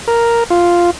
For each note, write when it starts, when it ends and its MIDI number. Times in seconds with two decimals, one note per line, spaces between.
0.08 0.44 70
0.50 0.90 65